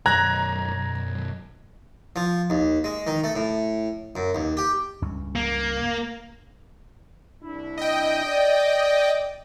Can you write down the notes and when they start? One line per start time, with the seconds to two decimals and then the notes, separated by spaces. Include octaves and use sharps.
0.06 B1 F#2 A#5 F#6 G#6 A#6
2.16 F3
2.50 D#2
2.84 G#3
3.07 D#3
3.24 A3
3.36 A2
4.16 F#2
4.35 D#2
4.57 G4
5.02 C#2 G2 C#4
5.36 A#3
7.43 C2 D4 E4
7.78 D#5 G5
8.25 D5